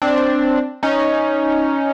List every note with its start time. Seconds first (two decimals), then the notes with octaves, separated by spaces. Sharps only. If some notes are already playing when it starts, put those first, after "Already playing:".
0.02 C4 D4
0.83 C#4 D#4